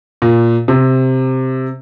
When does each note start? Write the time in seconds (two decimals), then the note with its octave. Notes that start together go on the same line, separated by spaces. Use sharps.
0.22 A#2
0.68 C3